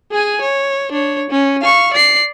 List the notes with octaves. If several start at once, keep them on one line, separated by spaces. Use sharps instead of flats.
G#4 G#5
C#5
D4 C#5
C#4
F5 C#6
D5 C7